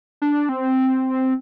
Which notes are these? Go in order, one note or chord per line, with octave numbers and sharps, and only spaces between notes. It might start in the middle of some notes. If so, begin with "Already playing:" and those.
D4
C4